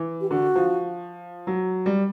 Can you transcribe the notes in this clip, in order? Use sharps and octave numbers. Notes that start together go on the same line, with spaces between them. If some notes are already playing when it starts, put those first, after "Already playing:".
Already playing: E3
G4
D3 F#4
F3
F#3
G3